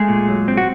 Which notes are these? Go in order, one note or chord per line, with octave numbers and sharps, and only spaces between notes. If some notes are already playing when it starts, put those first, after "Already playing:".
Already playing: G#3 A3 G#4
A#2
F#3
C4
F#4